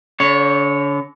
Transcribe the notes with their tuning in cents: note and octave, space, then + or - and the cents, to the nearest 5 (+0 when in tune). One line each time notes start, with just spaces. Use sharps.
D3 -40 C#5 +0